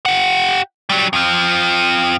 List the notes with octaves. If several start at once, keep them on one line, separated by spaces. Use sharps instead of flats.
G4 F#5
F#3 G3
F2 F3